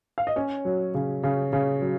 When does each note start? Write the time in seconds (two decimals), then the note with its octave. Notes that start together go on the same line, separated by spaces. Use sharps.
0.18 F5
0.27 D#5
0.36 C#4 C#5
0.65 F#3
0.94 C#3
1.23 C#3
1.53 C#3
1.81 F#3